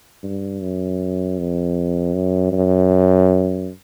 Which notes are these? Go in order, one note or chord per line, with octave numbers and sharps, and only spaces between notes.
G2
F#2
F2
F#2
F#2